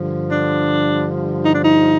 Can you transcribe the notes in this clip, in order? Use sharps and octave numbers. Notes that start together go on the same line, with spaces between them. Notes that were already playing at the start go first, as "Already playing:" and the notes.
Already playing: G2 D3 F3
D4
D#4
D4
D#4